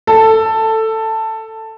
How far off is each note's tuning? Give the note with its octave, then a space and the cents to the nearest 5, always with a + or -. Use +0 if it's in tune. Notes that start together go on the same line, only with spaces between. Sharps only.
A4 +10